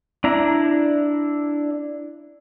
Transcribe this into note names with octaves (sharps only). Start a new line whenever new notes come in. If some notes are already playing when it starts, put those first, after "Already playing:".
D4 E4 A#5